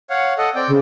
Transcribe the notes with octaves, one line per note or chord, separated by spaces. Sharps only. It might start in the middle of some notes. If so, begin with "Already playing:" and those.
C#5 F5 F#5
A4 D#5 F#5
C4 D5 G5
C#3